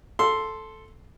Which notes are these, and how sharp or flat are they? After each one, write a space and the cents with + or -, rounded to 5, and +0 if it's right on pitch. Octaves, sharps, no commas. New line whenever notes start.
A4 +0 C6 +0